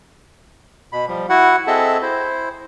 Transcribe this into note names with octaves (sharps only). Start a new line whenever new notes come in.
B2 B5
F3 G3
E4 F#4 F#5
C4 G#4 A4 D#5 E5 A5
E4 C5